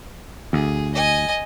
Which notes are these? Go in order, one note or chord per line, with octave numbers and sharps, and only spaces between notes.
D2 G#4
D#5 G#5